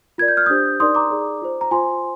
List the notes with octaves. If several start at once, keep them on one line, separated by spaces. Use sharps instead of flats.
F4 A#4 D5 G#6
G6
F6
D4 G4 C5 D#6 G6
D#4 A#4 D5 C6 D#6
A#5 D6
D#4 G#4 D5
F4 C5
A#5
F4 C5 G#5 C6